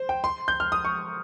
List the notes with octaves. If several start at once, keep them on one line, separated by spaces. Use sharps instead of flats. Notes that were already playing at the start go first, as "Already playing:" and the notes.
Already playing: C5
G5
C6
G6
F6
D#6
C#6